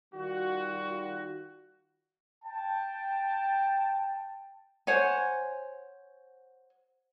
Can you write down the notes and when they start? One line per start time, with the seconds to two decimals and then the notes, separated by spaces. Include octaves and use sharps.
0.14 D#3 G3 F4 F#4
2.44 G5 A5
4.87 C5 C#5 F#5 G#5